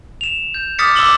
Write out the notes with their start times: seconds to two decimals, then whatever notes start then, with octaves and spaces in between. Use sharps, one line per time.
0.21 E7 F7
0.54 G6
0.79 D6 D#6 F6 A6 B6 C#7
0.95 C6 D6 E6 E7 F#7 G7